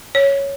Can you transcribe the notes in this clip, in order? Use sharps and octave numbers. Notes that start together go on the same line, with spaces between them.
C#5